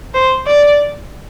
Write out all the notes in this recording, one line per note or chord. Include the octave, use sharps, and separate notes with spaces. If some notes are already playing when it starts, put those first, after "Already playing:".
C5
D5